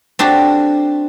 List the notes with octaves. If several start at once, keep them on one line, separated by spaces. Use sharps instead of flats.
C4 D4 F#4 G4 A4